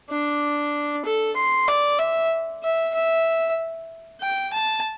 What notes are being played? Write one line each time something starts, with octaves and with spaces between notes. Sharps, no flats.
D4
A4
C6
D5
E5
E5
E5
G5
A5